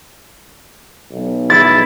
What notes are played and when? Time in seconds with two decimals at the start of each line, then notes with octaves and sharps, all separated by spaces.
1.11 B1
1.50 E4 A6